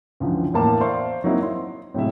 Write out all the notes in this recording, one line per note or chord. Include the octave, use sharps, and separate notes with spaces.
C#2 D3 E3 F3
E2 A2 A#3 A5 D6
C5 D5 E5 F5 C6 C#6
F#3 A#3 C4 D#4 E4
C6
A2 C3 F#3 G#3 E4 E5